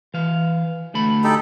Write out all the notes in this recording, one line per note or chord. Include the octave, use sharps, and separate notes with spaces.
E3 F5
D2 A3 B5
D#4 G4 A4